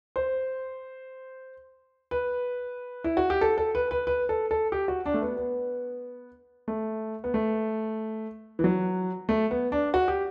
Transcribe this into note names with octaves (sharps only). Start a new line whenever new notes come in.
C5
B4
E4
F#4
G4
A4
A4
B4
B4
B4
A4
A4
G4
F#4
D4
A3
B3
B3
A3
B3
A3
E3
F#3
A3
B3
D4
F#4
G4